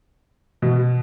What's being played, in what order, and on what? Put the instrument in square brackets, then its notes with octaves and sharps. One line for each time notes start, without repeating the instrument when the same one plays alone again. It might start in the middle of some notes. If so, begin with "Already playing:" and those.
[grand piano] B2